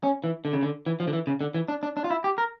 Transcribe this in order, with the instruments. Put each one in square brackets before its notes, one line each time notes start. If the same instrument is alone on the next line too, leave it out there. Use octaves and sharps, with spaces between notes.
[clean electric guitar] C#4
E3
D3
C#3
D3
E3
F3
D3
E3
C#3
D3
E3
D4
D4
D4
F4
E4
G4
A#4